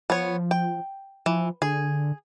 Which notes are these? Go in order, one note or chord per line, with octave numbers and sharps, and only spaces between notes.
F3 B3 C#5
G5
E3 F3
D3 G#4